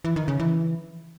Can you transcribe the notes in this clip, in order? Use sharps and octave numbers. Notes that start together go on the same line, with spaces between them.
E3
D#3
C#3
E3